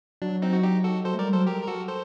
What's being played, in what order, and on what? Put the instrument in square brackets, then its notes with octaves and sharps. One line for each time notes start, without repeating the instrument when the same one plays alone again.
[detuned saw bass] F#3 [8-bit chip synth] D4
[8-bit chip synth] C4 D#4
F#4
D#4 G4
F#4 A4
[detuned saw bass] F#3 [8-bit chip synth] A4 C5
[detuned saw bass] A3
[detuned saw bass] G3 [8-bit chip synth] A#4 D5
[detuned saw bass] F#3 [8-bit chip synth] A4 C5
[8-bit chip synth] G4 A#4
A#4
F#4 A4
A4 C5